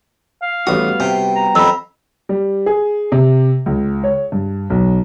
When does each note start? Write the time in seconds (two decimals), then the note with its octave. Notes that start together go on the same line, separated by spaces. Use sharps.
0.42 F5
0.67 A1 G3 B3 F#4 D#6
1.00 C3 G5
1.36 A#5
1.55 F2 B5 E6
2.29 G3
2.66 G#4
3.12 C3
3.66 C#2
4.04 C#5
4.32 G2
4.70 B1